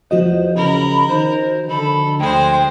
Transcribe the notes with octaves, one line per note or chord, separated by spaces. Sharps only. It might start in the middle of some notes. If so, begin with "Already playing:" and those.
E2 F3 F#4 C5 D#5
C#3 A#4 B5
D#3 C5
D3 A4 B5
D2 G#3 C5 G5